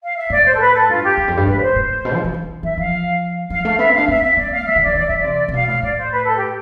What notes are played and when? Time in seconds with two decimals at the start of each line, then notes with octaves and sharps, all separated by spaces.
0.03 F5
0.17 E5
0.30 A2 D5
0.46 C5
0.54 A4
0.59 B4
0.75 A4
0.89 G2 F4
1.03 G4
1.17 E2
1.28 F2
1.37 G2
1.46 A2 B4
1.57 D5
1.61 C5
1.76 A2
2.05 B2
2.14 F3
2.24 F3
2.34 E3
2.63 E3 E5
2.78 F3 F5
3.50 F3 F5
3.65 A3 F5
3.79 B3 E5
3.89 C4
3.94 D4 F5
4.08 C4 E5
4.23 E5
4.37 B3 D5
4.52 F5
4.66 E3 E5
4.76 D3
4.81 E3 D5
4.95 E3 D5
5.07 E3 E5
5.18 D5
5.24 C3
5.48 C3
5.53 B2 F5
5.68 A2 F5
5.82 A2 D5
5.97 C5
6.11 B4
6.24 A4
6.37 G4